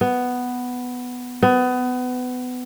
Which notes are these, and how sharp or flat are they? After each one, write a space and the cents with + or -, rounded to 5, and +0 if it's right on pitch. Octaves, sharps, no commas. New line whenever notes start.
B3 +5
B3 +25